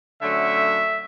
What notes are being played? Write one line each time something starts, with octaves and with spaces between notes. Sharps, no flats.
D3 F#3 A3 C#4 E5